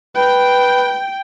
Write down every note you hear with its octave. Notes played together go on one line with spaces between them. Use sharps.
B4 G5